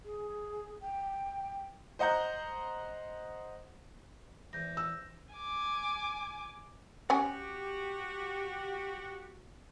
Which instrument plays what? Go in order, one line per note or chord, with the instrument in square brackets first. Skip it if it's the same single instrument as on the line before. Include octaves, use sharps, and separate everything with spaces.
[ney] G#4
G5
[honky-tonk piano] C5 D#5 F#5 A#5 G6
[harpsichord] E2 [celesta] C5 G6 A#6
[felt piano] E6
[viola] G#5 D6
[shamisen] C#4 F#5 G#5 [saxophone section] F#4 G4